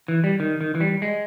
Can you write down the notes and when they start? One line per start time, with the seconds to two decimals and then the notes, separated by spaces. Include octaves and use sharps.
0.08 E3
0.24 G3
0.40 D#3
0.61 D#3
0.75 E3
0.81 G3
1.02 G#3